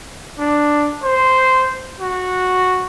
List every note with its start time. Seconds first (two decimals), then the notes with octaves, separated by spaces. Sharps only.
0.39 D4
1.03 C5
1.99 F#4